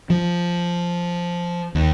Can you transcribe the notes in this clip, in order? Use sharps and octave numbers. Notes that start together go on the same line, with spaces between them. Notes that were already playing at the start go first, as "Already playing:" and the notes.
F3
D#2